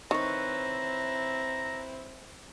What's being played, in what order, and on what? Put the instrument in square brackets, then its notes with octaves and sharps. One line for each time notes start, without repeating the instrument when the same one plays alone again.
[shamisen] D#3 [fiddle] C4 E4 [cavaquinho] B4 C#5 [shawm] A#5